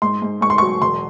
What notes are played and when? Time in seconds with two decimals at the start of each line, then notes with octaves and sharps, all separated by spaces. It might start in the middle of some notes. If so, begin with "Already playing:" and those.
0.02 G#2 C6
0.22 G#2
0.41 G#2 C#6
0.50 C6
0.58 F#3 C#6
0.81 E1 C6